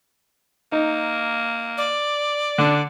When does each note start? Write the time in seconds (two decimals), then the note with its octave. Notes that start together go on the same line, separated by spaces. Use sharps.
0.72 A#3 D#4
1.78 D5
2.58 D3 D4